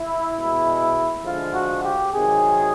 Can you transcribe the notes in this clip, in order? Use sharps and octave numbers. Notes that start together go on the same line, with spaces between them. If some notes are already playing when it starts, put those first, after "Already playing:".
Already playing: E4
B2 G#3
D3 F3 G#3 F4
F#4
G4
C3 D#3 F#3 G#4